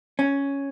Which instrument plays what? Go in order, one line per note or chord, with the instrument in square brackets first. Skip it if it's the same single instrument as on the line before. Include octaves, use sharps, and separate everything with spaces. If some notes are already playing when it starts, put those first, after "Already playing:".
[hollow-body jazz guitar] C#4